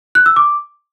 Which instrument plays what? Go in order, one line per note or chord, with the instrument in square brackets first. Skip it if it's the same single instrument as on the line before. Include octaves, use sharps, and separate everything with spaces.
[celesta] F#6
E6
D6